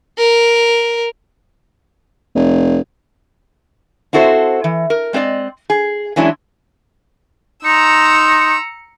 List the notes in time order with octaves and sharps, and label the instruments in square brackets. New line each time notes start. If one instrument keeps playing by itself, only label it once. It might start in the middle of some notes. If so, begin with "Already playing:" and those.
[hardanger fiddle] A#4
[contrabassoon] F1
[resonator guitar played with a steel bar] C4 E4 F#4 A4 C5
E3
A#4
G#3 C4 A#4 D5 D#5
G#4
E3 F#3 G#3 C#4 D4 E4
[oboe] D#4 [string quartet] A#5 E6 [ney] C6 [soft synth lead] C#7